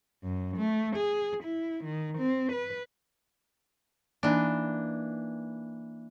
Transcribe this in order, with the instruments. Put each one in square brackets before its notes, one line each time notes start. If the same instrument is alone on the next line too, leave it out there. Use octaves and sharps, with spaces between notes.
[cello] F#2
A3
G#4
E4
D#3
C4
B4
[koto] E3 D4 [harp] A#3 D#4 B4